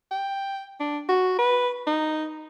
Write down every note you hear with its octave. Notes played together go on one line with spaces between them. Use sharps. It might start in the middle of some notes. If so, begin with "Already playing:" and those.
G5
D4
F#4
B4
D#4